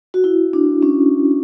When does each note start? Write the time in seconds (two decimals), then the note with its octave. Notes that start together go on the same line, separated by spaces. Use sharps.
0.14 F#4
0.24 E4
0.53 D4
0.82 C#4